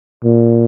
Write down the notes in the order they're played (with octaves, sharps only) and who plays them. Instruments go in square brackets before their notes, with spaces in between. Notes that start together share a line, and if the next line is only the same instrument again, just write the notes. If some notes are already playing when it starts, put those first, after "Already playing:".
[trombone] A#2